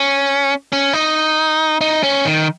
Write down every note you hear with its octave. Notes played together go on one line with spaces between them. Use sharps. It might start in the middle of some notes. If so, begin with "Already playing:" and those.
Already playing: C#4
C#4
D#4
D#4
C#4
D#3